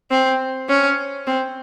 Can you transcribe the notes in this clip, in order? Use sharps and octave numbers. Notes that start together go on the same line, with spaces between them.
C4
C#4
C4